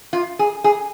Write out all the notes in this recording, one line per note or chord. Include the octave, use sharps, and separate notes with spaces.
F4
G#4
G#4